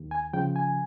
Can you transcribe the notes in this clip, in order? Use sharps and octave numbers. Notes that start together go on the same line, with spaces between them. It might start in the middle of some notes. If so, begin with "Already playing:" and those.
Already playing: D#2
G#5
C#3 F3 G5
G#5